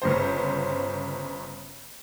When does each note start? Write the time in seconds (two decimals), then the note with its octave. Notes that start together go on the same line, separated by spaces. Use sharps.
0.02 G1 C#3 C5